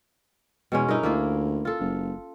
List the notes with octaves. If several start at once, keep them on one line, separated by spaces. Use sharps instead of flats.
E2 B2 G#3 C#4
G2 D#4 E4 A#4
D2 A#3 E4 F4
F4 A4
F#1